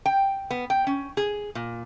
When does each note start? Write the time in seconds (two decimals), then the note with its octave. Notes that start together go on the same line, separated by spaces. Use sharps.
0.06 G5
0.51 B3
0.70 G5
0.87 C#4
1.17 G#4
1.55 A#2